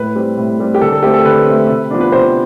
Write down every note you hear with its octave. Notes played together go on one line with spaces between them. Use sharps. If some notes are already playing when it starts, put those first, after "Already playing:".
Already playing: A2 B4
G3 C4
A2
G3 C4
G4
D3 A4
A4
A3 C4 G4
A4
D3 B4
A3 C4
C3
F3 B3 D4
B4
C3 C5